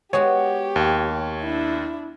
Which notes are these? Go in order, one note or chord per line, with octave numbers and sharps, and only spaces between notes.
G#3 B3 F#4 G4 C#5
D#2
D4 E4